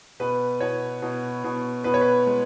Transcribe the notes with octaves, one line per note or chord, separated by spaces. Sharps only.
B2 B4
B2 C#5
B2
B2
B2 B4
C#5
B4
G#3